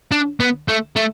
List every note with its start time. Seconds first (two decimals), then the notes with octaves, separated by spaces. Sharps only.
0.12 D4
0.40 B3
0.68 A3
0.96 A3